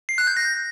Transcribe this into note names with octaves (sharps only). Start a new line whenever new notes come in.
C7
F#6
G6
A#6